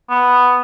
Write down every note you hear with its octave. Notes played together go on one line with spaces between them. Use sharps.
B3